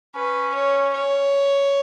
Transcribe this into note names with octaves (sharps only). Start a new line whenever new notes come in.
C#4 B4
C#5
C#5